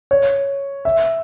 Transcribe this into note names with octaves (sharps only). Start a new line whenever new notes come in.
C#5
E5